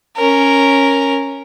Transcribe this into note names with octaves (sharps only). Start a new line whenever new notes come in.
C#4 A#4